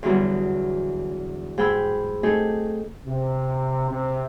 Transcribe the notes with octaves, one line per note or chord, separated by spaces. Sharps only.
E2 D3 F#3 G3 B3
G#2 G4 G#4 G5 B5 E6
A3 C4 D#4 G4 G#4
C3
C3